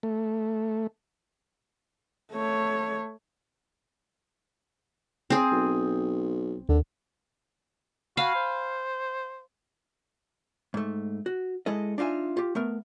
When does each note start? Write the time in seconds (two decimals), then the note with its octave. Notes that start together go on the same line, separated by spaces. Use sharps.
0.03 A3
2.33 A3 C#5
5.30 C4 G#4
5.51 B1
6.69 D#2 D3
8.17 F#4 F5 G#5 B5
8.35 C5
10.74 G#2 A3
11.26 F#4
11.66 G#3 E4 A4 D#5
11.98 D4 D#4 F4 E5 G#5
12.37 F4 G4
12.55 A3 B3 A#4